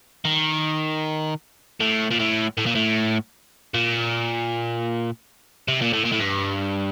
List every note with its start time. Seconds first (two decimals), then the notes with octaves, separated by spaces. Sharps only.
0.25 D#3
1.80 A2
2.11 A#2
2.19 A2
2.57 A2
2.66 A#2
2.75 A2
3.74 A#2
5.68 C3
5.82 A#2
5.93 A2
6.05 A#2
6.13 A2
6.20 G2